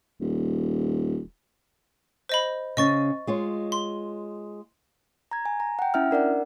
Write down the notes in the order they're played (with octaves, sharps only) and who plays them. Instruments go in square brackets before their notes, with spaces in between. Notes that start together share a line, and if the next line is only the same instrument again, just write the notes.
[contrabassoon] D#1
[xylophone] C5 D#5 B5
[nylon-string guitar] C#3 C#4 [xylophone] D#5 C#6 A6
[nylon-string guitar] G#3 F4 C#5
[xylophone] C6
[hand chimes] A#5 G#6
G#5
A#5
F#5 G5
C#4 E4 E5 F6
D4 A#4 D5 F#5